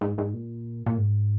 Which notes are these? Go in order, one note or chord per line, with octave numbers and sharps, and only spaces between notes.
G#2
G#2
A#2
A#2
G#2